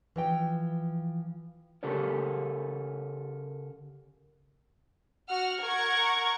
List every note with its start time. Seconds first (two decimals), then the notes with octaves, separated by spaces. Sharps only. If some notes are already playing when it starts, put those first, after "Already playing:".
0.16 E3 F3 G5
1.83 C#3 G4 A4 A#4 C#5
5.28 F#4 F#5 F6
5.60 A#4 F#5 C#6 G#6